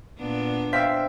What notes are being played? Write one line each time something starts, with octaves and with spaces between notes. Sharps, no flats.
A#2 B3 D4
C5 E5 F5 G5 B6